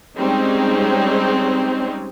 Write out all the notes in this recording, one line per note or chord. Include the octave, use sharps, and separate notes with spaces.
G3 G#3 C4 C#4 D#4